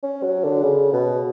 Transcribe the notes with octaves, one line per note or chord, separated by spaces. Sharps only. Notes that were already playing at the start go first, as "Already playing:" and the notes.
C#4
F#3
D3
C#3
B2